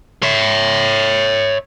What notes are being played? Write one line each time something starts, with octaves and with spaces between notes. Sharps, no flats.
C#5 E5